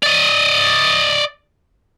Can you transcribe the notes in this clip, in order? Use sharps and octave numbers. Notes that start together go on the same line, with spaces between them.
D5 D#5